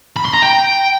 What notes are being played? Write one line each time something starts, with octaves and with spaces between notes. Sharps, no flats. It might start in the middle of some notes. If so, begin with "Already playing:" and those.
B5
C6
A#5
G5